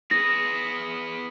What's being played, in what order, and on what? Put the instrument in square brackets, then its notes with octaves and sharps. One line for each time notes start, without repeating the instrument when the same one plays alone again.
[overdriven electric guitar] B3 G#4 [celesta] A#6